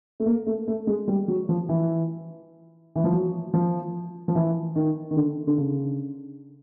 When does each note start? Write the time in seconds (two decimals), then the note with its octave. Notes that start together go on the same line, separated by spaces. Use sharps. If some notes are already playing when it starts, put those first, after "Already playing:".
0.20 A3
0.26 A#3
0.47 A3
0.68 A3
0.87 G#3
1.08 G3
1.28 F#3
1.49 F3
1.69 E3
2.96 E3
3.04 F3
3.13 F#3
3.54 F3
4.28 F3
4.35 E3
4.76 D#3
5.11 D#3
5.16 D3
5.47 D3
5.58 C#3